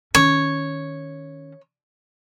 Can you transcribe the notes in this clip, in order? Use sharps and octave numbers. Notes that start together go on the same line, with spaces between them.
D#3 C#4 C#5